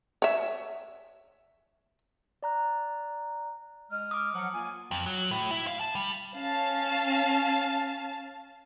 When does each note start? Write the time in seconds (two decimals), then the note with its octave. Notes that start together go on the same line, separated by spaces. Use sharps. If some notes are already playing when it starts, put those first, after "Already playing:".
0.22 C#5 E5
2.43 D5 A#5 F#6
3.91 G#3 D#5 F6
4.11 D6 D#6
4.34 F3 F#3 F#5
4.53 A#3 F4 G#5
4.91 F2
5.06 F#3
5.31 A2
5.51 E4
5.67 F5
5.81 A5
5.95 G3
6.37 C#4 F5 A5